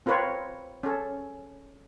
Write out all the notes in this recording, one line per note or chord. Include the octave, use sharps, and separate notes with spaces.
C4 F4 A#4 B4 C#5
C#4 A4